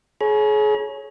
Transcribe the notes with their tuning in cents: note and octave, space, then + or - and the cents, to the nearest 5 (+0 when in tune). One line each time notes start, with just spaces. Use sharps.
G#4 +35 C#5 -5 A#5 +45